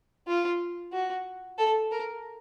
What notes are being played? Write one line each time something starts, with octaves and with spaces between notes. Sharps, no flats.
F4
F#4
A4
A#4